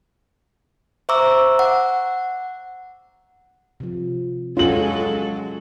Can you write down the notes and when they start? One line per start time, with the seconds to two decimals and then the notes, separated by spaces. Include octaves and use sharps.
1.09 C5 E5 A#5 C#6 D6 E6
1.59 F#5
3.80 C3 F3
4.57 F#3 G#3 C#4 F4 F#4 G#4 A4 F#7